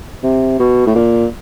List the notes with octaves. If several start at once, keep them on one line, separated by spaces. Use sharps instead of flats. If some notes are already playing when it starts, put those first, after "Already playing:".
C3
B2
A2
A#2